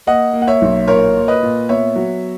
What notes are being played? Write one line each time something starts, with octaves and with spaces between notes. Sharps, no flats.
A#3 D#5 F#5
A#3
F#5
C#5 E5
B1
A#2 A#4 C#5
A#2
B4 D#5
A#2
B3 C#5 E5
F#3